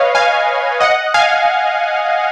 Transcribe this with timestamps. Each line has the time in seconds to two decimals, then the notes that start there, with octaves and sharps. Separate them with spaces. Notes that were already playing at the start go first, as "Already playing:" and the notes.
Already playing: B4 C#5 D#5 F5
0.15 F5 G#5
0.81 D#5 F#5
1.14 F5 G#5